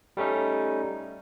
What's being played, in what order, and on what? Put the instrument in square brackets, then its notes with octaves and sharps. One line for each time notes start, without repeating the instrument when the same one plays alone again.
[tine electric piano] G3 A3 C#4 D#4